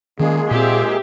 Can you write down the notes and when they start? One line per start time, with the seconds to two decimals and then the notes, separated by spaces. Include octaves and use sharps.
0.20 D#3 G#3 A#3 C#4 G#4
0.51 A#2 C4 G4 E5